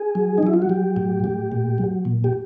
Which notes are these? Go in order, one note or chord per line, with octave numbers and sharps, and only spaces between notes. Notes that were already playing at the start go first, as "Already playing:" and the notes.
Already playing: G#4
F#3
D#4
F#3 E4
F4
F#4
F#3 G4
A2
A2
A#2
F#3
A#2
G4